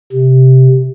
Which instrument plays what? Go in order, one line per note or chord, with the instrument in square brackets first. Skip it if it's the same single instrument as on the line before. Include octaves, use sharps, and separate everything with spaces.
[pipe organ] C3